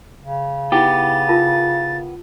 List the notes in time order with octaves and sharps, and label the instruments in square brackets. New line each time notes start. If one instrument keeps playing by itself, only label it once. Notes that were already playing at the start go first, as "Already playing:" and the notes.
[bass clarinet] C#3
[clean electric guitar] B3 G4 [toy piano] D#4 E4 G5 [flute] A6
[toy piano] F4 A#4 A5